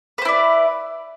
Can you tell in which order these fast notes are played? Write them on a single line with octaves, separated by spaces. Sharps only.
B4 C5 E4 D5